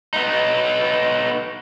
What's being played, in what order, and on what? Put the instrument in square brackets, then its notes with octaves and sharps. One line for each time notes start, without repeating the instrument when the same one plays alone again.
[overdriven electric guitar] B3 D#4